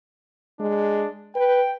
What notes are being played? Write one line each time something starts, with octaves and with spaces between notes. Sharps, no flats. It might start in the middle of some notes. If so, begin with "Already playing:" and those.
G#3 D4
B4 G5